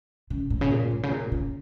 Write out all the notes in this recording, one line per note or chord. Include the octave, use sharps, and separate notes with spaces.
C#3
A2
C#3
A#2
A2
C#3
A#2
C#3